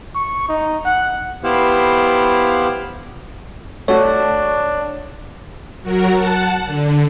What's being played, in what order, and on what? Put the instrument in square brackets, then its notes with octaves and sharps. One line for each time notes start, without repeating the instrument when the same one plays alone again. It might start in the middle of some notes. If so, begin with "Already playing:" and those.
[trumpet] C#6
D#4
F#5
[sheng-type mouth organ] B3 E4 G4 C5 F5
[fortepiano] A3 F#4 [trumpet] D4 [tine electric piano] C#5
[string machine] F#3 F#4 A#4
F#5 A5 F#6
D3